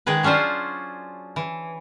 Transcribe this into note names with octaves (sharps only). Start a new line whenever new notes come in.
D#3 G#3 G#4 B4
F#3 C#4 D4 F4 C5
E3